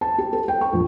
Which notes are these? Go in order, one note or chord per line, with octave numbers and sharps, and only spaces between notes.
A5
G4
A4
G5
C#6
A#1